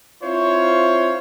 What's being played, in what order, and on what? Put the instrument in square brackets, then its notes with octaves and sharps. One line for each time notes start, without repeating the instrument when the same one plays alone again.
[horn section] C4 E4 F4 C5 C#5